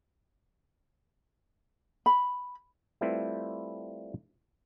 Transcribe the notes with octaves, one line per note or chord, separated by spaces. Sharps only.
B5
G3 A3 C4 E4 F4 B4